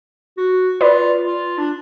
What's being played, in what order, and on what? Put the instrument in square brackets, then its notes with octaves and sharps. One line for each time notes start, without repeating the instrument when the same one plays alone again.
[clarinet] F#4
[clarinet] F4 [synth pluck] B4 D5
[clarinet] F4
D4